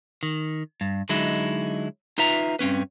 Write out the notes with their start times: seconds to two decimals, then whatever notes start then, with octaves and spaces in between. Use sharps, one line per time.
0.23 D#3
0.81 G2
1.09 D3 F#3 G#3 D#4 E4
2.18 D#4 F4 B4 E5 A#5
2.59 G2 C4 C#4 B4